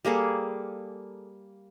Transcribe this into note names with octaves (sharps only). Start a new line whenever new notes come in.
G3 A#3 G#4 A4